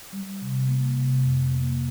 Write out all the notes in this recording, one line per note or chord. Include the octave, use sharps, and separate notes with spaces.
G3
C3
A#3
C3
F2
A#3